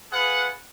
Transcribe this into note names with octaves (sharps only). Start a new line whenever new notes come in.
F4 G#4 B4 F#5